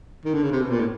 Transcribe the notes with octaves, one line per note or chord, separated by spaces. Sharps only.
D#3
D3
C#3
C3
B2
A#2
A2